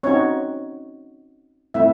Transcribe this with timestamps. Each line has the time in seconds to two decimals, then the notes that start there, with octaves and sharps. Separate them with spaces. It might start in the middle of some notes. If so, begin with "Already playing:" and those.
0.03 C4 C#4 D#4 F#4 C#5
1.74 A3 C4 E4 E5